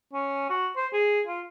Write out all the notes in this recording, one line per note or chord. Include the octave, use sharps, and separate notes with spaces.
C#4
F#4
C5
G#4
F4